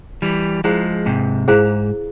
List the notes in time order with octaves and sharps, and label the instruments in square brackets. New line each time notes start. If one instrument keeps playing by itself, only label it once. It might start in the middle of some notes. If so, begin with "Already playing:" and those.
[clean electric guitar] E3 G3
[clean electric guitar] F3 G#3 [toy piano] E4 G#4 C5 F5 A#5
[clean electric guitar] G#2 C3
[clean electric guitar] G#2 [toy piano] E4 G#4 C5 F5 A#5